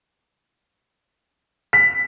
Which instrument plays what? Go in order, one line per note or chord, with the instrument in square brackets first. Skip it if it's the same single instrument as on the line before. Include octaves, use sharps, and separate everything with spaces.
[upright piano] B6